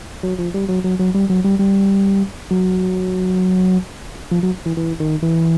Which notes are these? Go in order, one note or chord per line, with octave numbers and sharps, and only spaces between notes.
F#3
F3
G3
F#3
F#3
F#3
G3
F#3
G3
G3
F#3
F3
F#3
E3
E3
D#3
E3